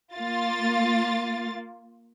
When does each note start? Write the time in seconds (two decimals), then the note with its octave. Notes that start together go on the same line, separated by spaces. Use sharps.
0.14 A#3 F4 A6